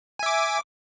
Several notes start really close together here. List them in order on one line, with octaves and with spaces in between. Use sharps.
G#5 E5 D6